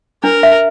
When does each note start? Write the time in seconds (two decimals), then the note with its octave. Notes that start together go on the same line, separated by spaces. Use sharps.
0.24 D4 A#4
0.43 E5